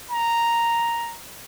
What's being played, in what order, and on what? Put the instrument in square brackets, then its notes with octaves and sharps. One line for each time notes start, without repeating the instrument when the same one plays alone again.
[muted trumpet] A#5